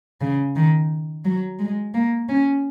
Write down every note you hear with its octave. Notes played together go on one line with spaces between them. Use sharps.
C#3
D#3
F#3
G#3
A#3
C#4